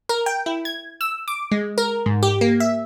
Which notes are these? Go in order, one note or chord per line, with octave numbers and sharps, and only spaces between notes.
A#4
G5
E4
G#6
E6
D6
G#3
A#4
G#2
G4
A#3
E5